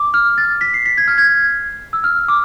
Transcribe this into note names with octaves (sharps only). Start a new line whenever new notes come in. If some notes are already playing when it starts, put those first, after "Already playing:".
Already playing: D6
F6
A6
B6
C7
B6
G#6
F6
G#6
E6
F6
D6